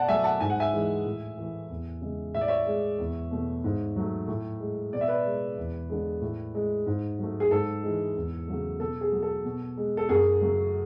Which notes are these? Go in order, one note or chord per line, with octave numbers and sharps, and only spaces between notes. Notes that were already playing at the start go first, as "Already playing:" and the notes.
Already playing: B2 D5 F#5 A5
F#3 A3 E5 G#5
F#5 A5
G#2 G#5
F#5
E5 G#5
E3 G#3
A2
E3 A3
E2
C#3 G#3
A2 E5
D5
C#5 E5
G#3
E2
B2 A3
G#2
F#3 A3
A2
G#3
B2 D5
E5
B4 D5
G#3
E2
D3 G#3
A2
G#3
G#2
F#3 A3
G#4
G#2 A4
E3 G#3
E2
C#3 F#3 A3
B2 A4
G#4
F#3 A3
A4
B2
G#3
A4
F#2 G#4
C#3 F#3 A3